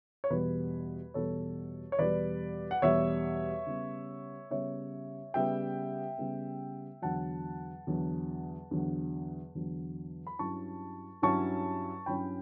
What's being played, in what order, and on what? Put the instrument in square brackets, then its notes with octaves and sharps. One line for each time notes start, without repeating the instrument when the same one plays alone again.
[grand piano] C#5
E2 B2 G3 B4
E2 B2 G3 A4 C#5
C#5
E2 B2 G3 B4 D5
F#5
E2 B2 G3 C#5 E5
C#3 G3 B3
C#3 G3 B3 C#5 E5
C#3 G3 B3 E5 G5
C#3 G3 B3
E2 D3 F#3 F#5 A5
E2 D3 F#3
E2 D3 F#3
E2 D3 F#3
B5
G2 F#3 C#4 E4 A5 C#6
G2 F#3 C#4 E4 A5 C#6
G2 F#3 C#4 E4 G5 B5